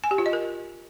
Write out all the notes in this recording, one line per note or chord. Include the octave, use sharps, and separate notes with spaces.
G#5
G4
F4
D#5
A#4